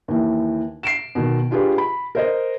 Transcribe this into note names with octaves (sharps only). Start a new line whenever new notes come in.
D#2 E3
C7 D7 E7
B2 D#3
D4 F4 G4 G#4 B4
B5
A#4 C5 D#5